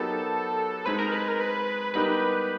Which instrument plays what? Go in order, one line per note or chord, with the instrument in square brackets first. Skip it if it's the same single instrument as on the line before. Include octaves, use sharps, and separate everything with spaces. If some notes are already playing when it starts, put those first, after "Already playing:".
Already playing: [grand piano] F#3 B3 D#4 G4 A#4 [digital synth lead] A4
[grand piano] G#3 C4 D#4 [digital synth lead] B4
[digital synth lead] A#4
B4
A#4
B4
[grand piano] G3 B3 D#4 G4 A#4 [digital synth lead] B4